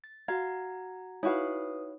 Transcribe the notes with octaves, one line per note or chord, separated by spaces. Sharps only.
A6
F#4 F5 F#5 A#5 G#6
D#4 E4 F#4 B4 C#5 F5 D#6